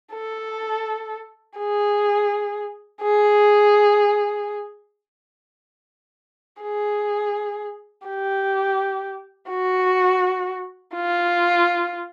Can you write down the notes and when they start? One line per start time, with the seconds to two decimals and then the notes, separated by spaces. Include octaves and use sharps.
0.13 A4
1.58 G#4
3.02 G#4
6.63 G#4
8.07 G4
9.50 F#4
10.95 F4